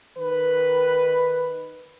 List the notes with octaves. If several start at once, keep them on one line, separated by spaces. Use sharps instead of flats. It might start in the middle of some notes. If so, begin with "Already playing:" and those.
D#3 B4